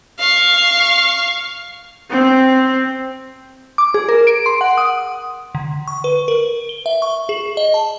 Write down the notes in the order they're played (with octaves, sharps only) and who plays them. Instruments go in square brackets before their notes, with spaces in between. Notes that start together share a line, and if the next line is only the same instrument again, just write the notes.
[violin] F5 C#6
[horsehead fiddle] C4
[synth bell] D6
G#4
A#4
D7
C6
F#5
D#6
D3
C#6
B4
A#4
G7
E5
C#6
G#4
D#5
A5